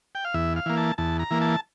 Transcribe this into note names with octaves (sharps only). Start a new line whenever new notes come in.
G5
F5
E2 E5
F5
E3 A#3
A5
E2 A5
A#5
E3 A#3
A5